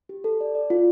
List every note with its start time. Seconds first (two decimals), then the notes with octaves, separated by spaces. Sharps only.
0.09 G4
0.24 A4
0.41 D5
0.55 D5
0.70 F4